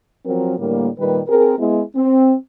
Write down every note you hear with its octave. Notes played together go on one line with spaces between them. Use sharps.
F3 F#3 C4 A#4
A2 D3 G3 A#3
A#2 D#3 G3 A#3 G4 B4
C4 G#4 A#4
G#3 B3 E4
C4